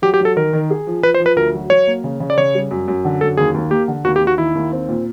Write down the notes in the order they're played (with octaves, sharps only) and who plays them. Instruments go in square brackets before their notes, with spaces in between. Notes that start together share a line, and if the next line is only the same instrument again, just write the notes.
[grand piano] F#3 [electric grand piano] G4
[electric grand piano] G4
[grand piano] F#3 [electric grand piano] A4
[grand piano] D#3 [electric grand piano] A#4
[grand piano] D#3
G#4
F3
[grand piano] F3 [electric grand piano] B4
[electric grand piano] C5
[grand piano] F3
[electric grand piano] B4
[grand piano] D2 [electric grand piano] A#4
[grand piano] F#3
[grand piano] F#3 [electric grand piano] C#5
[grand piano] A#3
C#3
C#3
[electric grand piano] D5
[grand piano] C#3 [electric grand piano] C#5
[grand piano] G3
F#2
F#2
D3
[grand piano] F#2 [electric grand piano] A4
[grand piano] D#2 [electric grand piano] G#4
[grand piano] D#2
[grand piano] A#3 [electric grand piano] G4
[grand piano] D3
[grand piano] D#2 [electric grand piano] F#4
[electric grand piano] G4
[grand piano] D#2
[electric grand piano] F#4
[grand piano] D#3 [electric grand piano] E4
[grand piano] D#2
C4
A#2